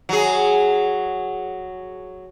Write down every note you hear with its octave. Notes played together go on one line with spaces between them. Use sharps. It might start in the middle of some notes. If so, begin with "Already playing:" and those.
F#3 G#4